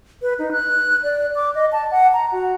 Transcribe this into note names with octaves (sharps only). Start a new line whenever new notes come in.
B4
D#4
F#6
D5
D6
D#5
A5
F#5
A#5
F#4